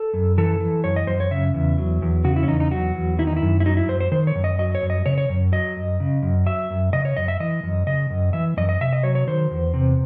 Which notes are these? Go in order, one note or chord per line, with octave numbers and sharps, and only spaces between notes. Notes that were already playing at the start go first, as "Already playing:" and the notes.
Already playing: A4
F#2
E3 A4
E3
F#2 C#5
D#5
F#2 C5
C#5
C#3 E5
E2
F#3
E2
C#3 F#4
E4
C#4
E2 D#4
D#4
F#3 F#4
E2
D#3 E4
D#4
E4
F#2
E4
F#3 D#4
E4
F#2 C5
C5
D#3 C5
C#5
F#2
D#5
F#3 D#5
C#5
F#2
D#5
C#3 C#5
C#5
F#2
F#3 D#5
F#2
C#3
F#2
F#3 E5
F#2
C#3 D#5
C#5
F#2 D#5
E5
E3 D#5
F#2
C#3 D#5
F#2
E3 E5
F#2 D#5
D#5
C3 E5
D#5
F#3 C#5
C#5
D#3 C5
E2
C3